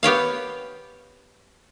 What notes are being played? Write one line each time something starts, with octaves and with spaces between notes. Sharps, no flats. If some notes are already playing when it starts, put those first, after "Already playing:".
B3 G4 C#5 F5